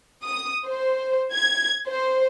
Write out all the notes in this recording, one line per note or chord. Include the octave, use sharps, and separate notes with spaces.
D#6
C5
G#6
C5